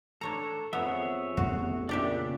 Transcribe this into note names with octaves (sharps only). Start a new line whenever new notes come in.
D4 A4 C#5 A#5
F2 B3 G#4 C#5 E5
A1 F2 B3 F#4
A#2 C#3 D4 G4 D5 E5 F#6